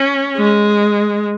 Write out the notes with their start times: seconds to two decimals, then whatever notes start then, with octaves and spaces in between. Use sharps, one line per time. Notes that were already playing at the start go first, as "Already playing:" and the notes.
Already playing: C#4
0.37 G#3